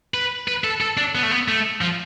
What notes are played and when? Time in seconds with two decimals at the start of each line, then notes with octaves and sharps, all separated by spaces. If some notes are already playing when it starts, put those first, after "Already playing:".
0.14 B4
0.48 B4
0.64 A4
0.81 A4
0.97 D4
1.15 B3
1.23 A3
1.31 B3
1.48 A3
1.81 F3